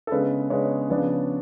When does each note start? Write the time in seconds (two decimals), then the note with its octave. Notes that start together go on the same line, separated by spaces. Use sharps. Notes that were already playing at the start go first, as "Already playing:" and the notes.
0.07 A4
0.12 C#3 G#3 B3 D4 B4
0.50 C#3 G#3 B3 D4 C#5
0.90 C#3 F3 B3 D4